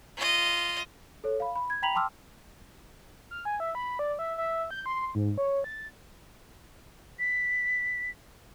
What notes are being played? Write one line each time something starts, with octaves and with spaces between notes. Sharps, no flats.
F4 D#5
A4 C#5
F5 B5
B5
G#6
G5 A#5 B5 B6 F7 F#7
G5 A5 C6 D6 E6 F6
F6
G#5
E5
B5
D5
E5
E5
G6
C6
G#2
C#5
A6
B6